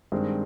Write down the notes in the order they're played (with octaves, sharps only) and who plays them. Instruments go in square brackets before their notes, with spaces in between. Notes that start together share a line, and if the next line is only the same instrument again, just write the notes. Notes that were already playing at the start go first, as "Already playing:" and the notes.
[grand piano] G2 D#3 G#3 C4